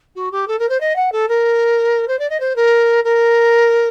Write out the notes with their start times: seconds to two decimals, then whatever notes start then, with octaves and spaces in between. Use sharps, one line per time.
0.16 F#4
0.32 G4
0.48 A4
0.59 A#4
0.69 C5
0.80 D#5
0.96 F#5
1.12 A4
1.28 A#4
2.08 C5
2.19 D5
2.30 D#5
2.40 C5
2.56 A#4
3.04 A#4